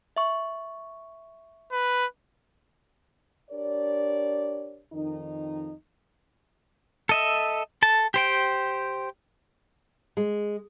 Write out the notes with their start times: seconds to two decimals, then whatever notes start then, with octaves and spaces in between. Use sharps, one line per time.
0.17 E5 C#6
1.72 B4
3.51 D4 G4 A#4 C#5 D5
4.92 F2 D#3 D#4
7.09 A4 D#5 E5
7.82 A4 A5
8.14 G4 C5 G5
10.17 G#3